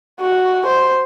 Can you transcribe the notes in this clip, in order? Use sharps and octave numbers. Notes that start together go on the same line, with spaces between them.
F#4
C5